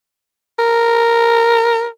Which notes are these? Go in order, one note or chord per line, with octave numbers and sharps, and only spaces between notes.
A#4